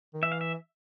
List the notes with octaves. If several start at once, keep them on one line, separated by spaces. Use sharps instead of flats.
D#3
E3 E5
F5
E5